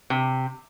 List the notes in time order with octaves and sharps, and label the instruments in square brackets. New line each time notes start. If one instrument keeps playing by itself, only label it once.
[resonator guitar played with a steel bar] C3